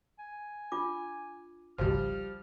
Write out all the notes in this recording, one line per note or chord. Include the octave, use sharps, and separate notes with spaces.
G#5
D4 F4 D6
G#1 C#2 F3 G3 F6